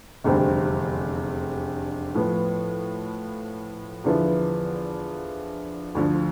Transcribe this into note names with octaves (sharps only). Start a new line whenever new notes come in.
F1 E2 D3 G3 C4
A2 F3 B3
E2 D3 F3 B3 E4
D2 D3 F3